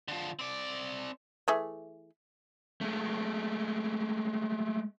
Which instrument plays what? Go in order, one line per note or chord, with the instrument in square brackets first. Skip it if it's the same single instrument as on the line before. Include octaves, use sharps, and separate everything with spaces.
[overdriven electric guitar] D3 F3
C4 D5
[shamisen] E3 A3 G#4
[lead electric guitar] G#3 A3